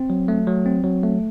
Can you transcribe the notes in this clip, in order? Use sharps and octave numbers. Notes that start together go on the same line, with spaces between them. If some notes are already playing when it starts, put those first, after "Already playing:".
Already playing: C4
F#3
A3
F#3
C4
F#3
A3